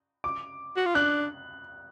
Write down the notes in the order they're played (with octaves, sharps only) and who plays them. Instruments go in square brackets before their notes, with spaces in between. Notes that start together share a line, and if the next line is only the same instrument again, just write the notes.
[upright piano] D6
[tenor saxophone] F#4
F4
[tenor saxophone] D4 [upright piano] F#6